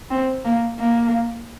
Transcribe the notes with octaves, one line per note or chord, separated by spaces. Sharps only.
C4
A#3
A#3